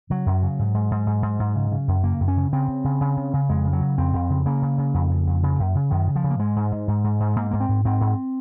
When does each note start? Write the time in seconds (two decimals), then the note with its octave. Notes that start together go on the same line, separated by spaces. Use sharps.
0.10 C#3 F#3
0.26 F#2
0.43 C#3
0.59 G#2
0.74 G#2
0.91 G#2
1.07 G#2
1.22 G#2
1.39 G#2
1.56 C#3
1.72 C#3
1.88 F#2
2.03 C#3 A#3
2.20 F#2
2.28 C#4
2.37 C#3
2.52 C#3 C4
2.68 C#3
2.84 C#3
3.01 C#3
3.17 C#3
3.33 C#3
3.49 F2 G#3
3.65 C#3
3.73 F#3
3.81 C#3
3.98 F2 C4
4.13 F2
4.30 C#3
4.46 C#3 A#3
4.62 C#3
4.78 C#3
4.94 F2
5.10 C#3
5.27 F2
5.43 C#3
5.59 F#2
5.75 C#3
5.91 F#2 D#3
6.07 C#3
6.15 F3
6.24 C#3
6.30 A#3
6.39 G#2 G#3
6.56 G#2
6.72 G#2
6.88 G#2
7.04 G#2
7.20 G#2
7.36 G#2 A#3
7.51 G#2 A#3
7.60 C4
7.68 G#2
7.85 G#2 C4
8.01 G#2